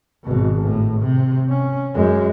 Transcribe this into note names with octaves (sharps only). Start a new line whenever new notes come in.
G#1 B2
A2
C3
C#4
F#2 G#3